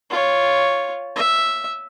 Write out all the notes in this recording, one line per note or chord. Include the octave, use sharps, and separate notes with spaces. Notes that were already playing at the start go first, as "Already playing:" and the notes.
F4 C#5
E5